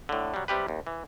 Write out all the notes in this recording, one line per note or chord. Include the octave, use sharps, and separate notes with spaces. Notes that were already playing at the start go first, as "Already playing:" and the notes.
A2 D3
F#3 G3
C3 G3 G4 B4
D#2
E3